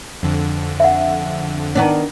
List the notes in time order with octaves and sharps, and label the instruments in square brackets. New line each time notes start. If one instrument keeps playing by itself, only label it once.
[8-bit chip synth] F2 D3
[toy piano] E5 F#5
[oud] D#3 B3 D4